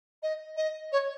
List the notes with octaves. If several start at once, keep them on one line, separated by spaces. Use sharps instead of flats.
D#5
D#5
C#5